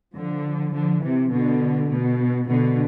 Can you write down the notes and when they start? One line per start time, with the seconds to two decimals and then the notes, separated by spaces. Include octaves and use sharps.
0.15 D3 F3
0.73 D3 F3
1.02 C3 E3
1.32 B2 D3
1.90 B2
2.48 B2 D3